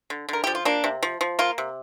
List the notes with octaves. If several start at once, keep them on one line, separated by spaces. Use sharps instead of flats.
D3
D3 A#4
F3 G4
F4
A#3 D4
C3
F3
F3
A#3 F4
C3